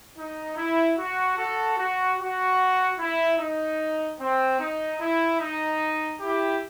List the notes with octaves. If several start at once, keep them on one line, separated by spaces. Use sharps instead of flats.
D#4
E4
F#4
F#4 A4
F#4
F#4
E4
D#4
C4
D#4
E4
D#4
E4 G4